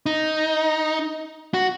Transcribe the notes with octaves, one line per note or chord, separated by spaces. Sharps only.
D#4
F#4